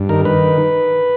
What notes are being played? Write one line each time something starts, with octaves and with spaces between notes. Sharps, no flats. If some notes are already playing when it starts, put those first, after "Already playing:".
Already playing: G2
D#3 A#4
D#3 B4